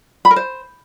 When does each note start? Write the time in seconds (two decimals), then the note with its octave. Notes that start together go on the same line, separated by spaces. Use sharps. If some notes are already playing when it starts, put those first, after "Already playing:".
0.25 B5
0.31 A#4
0.36 C5